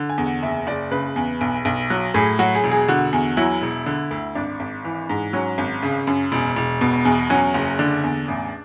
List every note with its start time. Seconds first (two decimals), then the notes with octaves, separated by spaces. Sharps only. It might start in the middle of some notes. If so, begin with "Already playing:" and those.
Already playing: D3
0.10 G#5
0.18 E2
0.26 F#5
0.43 F#1 E5
0.67 F#1 D5
0.91 C#3 B4
1.16 E2
1.41 B1
1.65 B1
1.90 F#3
2.14 A2 G#4
2.39 F#3 F#4
2.55 G#4
2.64 E1
2.71 G#4
2.88 D3 F#4
3.13 E2
3.37 F#3 E4
3.62 E1
3.86 D3
4.11 D2
4.35 G#1 D4
4.60 G#1
4.84 E3
5.09 G#2
5.33 F#3 C#4
5.58 G#1
5.83 C#3
6.07 F#2
6.32 E1
6.56 E1
6.81 B2
7.05 E2
7.30 F#3 C#4
7.54 F#1
7.79 D3 D4
8.04 E2
8.28 A1